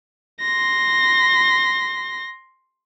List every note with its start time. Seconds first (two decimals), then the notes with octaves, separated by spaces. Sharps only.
0.41 C6 A#6